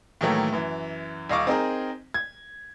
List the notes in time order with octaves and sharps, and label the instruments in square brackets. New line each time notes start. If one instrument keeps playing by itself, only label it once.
[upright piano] A2 D#3 E3 F#3 A3 A#3
F#2 E3
D#1 D#5 F5 C#6 D6
C4 D#4 G#4 A#4
G#6